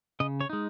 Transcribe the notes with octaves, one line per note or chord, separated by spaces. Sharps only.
C#3 D#5
C#5
G#3 D#4